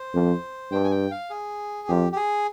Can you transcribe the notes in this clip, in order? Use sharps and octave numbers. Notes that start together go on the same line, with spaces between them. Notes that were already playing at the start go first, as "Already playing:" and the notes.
Already playing: C5
F2
G2 G5
G#5
G5
F5
G#4
F2 G4
G4
G#4